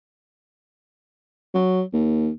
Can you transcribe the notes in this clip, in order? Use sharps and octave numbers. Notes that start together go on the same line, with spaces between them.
F#3
D#2